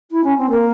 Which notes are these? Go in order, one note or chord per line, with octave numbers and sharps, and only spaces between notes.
E4
C#4
C4
A#3